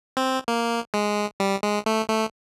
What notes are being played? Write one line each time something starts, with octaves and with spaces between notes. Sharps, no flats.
C4
A#3
G#3
G3
G#3
A3
A3